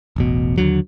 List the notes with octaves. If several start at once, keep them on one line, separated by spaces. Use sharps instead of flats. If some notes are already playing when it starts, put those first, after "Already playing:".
E1 A1 B2
D#2 D3 F#3